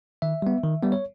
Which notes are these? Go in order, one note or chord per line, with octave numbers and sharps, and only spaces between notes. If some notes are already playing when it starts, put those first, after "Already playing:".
D#3 E5
G3 B3
D#3
G3 B3
C#5